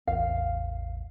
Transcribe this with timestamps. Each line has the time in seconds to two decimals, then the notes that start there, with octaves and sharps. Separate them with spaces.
0.07 A1 E2 F5